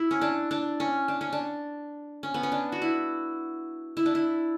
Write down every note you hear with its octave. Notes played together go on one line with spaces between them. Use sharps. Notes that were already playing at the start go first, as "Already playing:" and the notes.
Already playing: E4
C#4
D4
D4
C#4
D4
C#4
D4
C#4
B3
C#4
D4
F#4
E4
E4
D4
E4